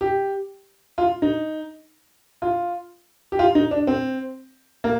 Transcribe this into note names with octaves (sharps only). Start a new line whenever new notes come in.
G4
F4
D#4
F4
G4
F4
D#4
D4
C4
A#3